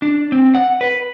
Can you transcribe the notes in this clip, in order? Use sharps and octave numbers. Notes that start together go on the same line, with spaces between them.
D4
C4
F#5
B4